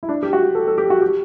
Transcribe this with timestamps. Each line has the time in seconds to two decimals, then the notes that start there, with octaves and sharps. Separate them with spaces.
0.03 E4
0.09 D4
0.23 G4
0.33 F#4
0.55 A4
0.67 A4
0.78 G4
0.90 F#4
1.02 G4